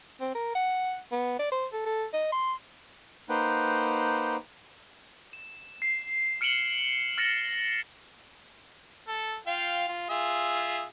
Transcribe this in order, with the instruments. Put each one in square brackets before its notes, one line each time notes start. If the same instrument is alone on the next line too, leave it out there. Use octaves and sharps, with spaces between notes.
[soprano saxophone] C4
A#4
F#5
B3
D5
C5
A4
A4
D#5
C6
[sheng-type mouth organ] A#3 D#4 B4 C5 F#5 G5
[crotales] E7
C7
F6 C#7 D7 E7 F#7 G7
F6 A6 A#6 C#7 E7
[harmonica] A4
F4 F5 G5
F4
F4 G#4 E5